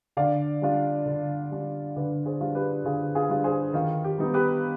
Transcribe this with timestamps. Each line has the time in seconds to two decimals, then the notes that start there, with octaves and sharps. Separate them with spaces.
0.17 D3 D5 F5
0.62 G3 D4 F4
1.06 D3
1.51 G3 D4 F4
1.96 D3 B4 D5
2.26 G#4 C5
2.41 G3 D4 F4
2.55 G4 B4
2.85 D3 F4 G#4
3.15 F4 G#4
3.29 G3 D4 F4
3.44 G#4 C5
3.74 D#3 F4
4.04 G4
4.18 G3 B3 D#4
4.34 G4 B4